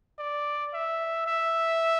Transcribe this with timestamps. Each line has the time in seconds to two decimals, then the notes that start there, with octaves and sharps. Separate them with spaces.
0.19 D5
0.73 E5
1.27 E5